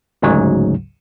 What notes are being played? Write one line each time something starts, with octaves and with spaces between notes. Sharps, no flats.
A1 D2 G#2 C#3 F#3